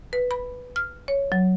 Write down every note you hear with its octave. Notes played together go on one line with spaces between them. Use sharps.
B4
B5
F6
C#5
F#3